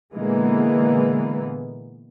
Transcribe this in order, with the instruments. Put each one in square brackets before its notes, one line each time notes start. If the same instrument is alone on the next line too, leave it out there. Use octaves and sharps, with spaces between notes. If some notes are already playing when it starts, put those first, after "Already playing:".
[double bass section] A#2 D3 E3 G#3 A#3 B3